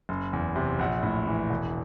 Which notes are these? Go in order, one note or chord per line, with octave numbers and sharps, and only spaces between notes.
F#1
E2
C3
A#1 F#5
A2
E3
E1